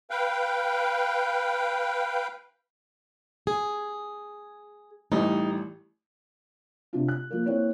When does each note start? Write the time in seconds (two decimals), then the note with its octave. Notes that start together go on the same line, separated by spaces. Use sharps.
0.10 B4 F5 G5
3.47 G#4
5.12 A1 E3 G3 D#4
6.93 C3 D4 F4
7.08 F#6
7.31 F3 A#3
7.46 A#3 C4 E4 C#5